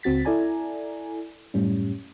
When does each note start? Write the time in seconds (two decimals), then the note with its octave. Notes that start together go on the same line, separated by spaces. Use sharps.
0.03 C#2 C4 F#4 A6 B6
0.25 E4 A4 D5 G#5 A#5
1.54 F#2 A2 G3 C#4